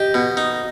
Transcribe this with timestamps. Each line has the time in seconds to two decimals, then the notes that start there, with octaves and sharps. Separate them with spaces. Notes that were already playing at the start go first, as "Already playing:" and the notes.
Already playing: G4 D#5
0.14 B2
0.37 D#4